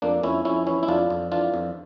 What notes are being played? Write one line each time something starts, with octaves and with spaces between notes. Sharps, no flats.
F2 A#3 D4
F2 C#4 E4
F2 C#4 E4
E3 C#4 E4
E4
F2 D4 F4
F2
E3 D4 F4
F2